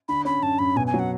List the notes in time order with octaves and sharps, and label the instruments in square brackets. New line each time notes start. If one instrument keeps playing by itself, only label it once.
[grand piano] D3 [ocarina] B5
[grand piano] C#4 [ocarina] B5
[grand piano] F#2 [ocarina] A5
[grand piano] F#2 [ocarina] B5
[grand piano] B2 [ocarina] G#5
[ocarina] G#5
[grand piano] F#3
[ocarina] F#5